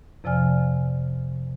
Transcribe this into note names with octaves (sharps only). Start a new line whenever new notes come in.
F2 C3 F3 D5 G#5 F6